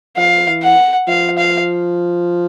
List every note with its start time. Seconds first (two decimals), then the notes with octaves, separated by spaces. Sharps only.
0.17 F3 F5
0.48 E3
0.63 F#5
1.08 F3 F5
1.38 F5